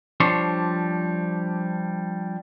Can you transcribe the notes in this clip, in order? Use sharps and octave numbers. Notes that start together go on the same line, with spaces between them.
F3 G3 D4 C5 C#5